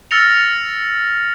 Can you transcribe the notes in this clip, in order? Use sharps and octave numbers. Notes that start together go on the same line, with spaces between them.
E6 F6 A6 A#6 C#7 F7